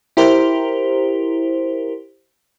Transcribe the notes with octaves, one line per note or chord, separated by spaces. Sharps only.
E4 G4 A#4 C5